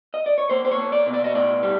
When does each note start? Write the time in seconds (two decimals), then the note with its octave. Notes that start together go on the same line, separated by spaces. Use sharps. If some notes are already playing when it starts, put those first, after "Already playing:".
0.14 D#5
0.26 D5
0.38 C#5
0.50 A#3 C5
0.65 C5
0.71 C#5
0.78 A#3
0.92 D5
1.07 B2
1.14 D5
1.24 D#5
1.35 A2 D5
1.63 G3